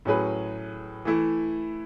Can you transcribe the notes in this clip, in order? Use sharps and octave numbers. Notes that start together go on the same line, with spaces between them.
A2 F#3 C#4 G#4 B4
E3 A3 E4